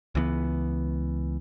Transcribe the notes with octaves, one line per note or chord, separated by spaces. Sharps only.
C#2 E3 A3 B3